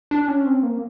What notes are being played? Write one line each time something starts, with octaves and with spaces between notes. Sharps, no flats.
D4
C#4
C4
A#3